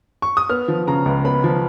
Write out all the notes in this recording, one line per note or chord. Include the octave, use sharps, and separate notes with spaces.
C#6
D#6
B3 F6
F3
C#3 A#5
C#2
B3 B5
F3